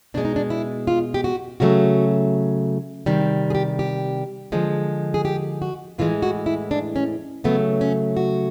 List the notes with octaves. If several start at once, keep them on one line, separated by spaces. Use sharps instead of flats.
B2 G#3 D4
D#4
D4
E4
F4
G4
F#4
C#3 F#3 A3 F#4
C3 D#3 G3
G#4
G4
G4
D3 F3 G#3
G#4
G4
F#4
A2 E3 G#3 F4
F#4
E4
D4
C#4
C#3 F#3 A3 B3
C#4
F#4